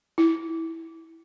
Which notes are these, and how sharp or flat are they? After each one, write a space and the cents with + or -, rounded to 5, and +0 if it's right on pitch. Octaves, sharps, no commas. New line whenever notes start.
E4 -10